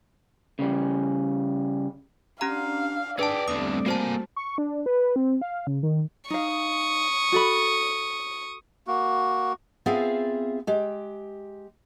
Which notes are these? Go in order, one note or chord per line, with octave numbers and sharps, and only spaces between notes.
C#3 G3
C#4 D4 G4 F5 A#5
G#4 B4 D5 G5 A5
E2 D3 G3 A3 C4 D#6
A#3 F#4 C5 G#5 A5
C#6
D4
B4
C4
F5
C#3
D#3
D#4 F5 C#6 D#6
F#4 A4 B5
A#3 F#4
B3 C4 F4 G#4 E5 F5
G#3 G4